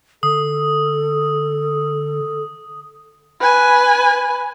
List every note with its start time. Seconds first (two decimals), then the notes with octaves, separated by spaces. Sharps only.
0.23 D3 A4 D#6
3.40 B4 G#5